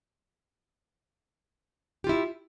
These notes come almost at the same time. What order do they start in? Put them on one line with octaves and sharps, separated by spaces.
G4 F4 E4